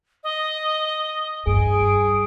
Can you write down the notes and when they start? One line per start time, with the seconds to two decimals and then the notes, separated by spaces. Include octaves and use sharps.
0.24 D#5
1.47 G2 G#4 D7